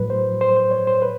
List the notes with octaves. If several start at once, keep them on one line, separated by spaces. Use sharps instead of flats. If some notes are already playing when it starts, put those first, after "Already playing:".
Already playing: A2 F#3 B4
C5
C5
C5
C#5
C5
B4